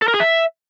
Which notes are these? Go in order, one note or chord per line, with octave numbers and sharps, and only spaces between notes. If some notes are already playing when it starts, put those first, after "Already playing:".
A4
A#4
G#4
E5